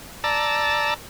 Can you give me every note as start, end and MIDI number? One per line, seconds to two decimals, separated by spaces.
0.24 0.94 74
0.24 0.94 81
0.24 0.94 82
0.24 0.94 88